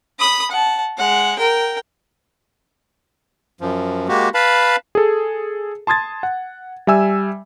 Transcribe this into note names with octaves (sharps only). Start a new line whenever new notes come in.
B5 D#6
F#5 A5
G#3 F#5
A#4 G5
F#2 F3
G#3 A#3 F#4 G4
B4 F5 A5 B5
G#4 A4
A5 C6 D#6 G#6 A6
F#5
G3 E5 G#5 E6